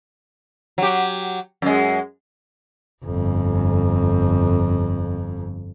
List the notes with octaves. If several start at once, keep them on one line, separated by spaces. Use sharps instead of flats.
F#3 G4
F#2 G#3
G1 F2